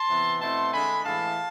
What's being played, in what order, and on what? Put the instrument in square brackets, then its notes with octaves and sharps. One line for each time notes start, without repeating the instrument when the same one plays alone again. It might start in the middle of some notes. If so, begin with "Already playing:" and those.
Already playing: [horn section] A5 C6
C3 E3 B3
B2 A3 C4 E4 A5 C6
D3 G#3 D4 G#5 B5
A2 E3 G#3 F5 A5